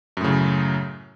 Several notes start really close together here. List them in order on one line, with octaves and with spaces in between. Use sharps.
F#2 A2 C#3 F#3